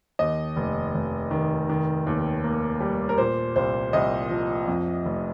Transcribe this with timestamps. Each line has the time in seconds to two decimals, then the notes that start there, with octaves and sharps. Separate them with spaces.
0.19 D#2 D#5
0.56 F1
0.94 F1
1.31 D#3
1.69 D#3
2.07 D#2
2.44 A#3
2.80 G3
3.09 A#4
3.18 A#2 C5
3.56 C2 C5
3.93 C2 D#5
4.30 F3
4.68 F2
5.05 F1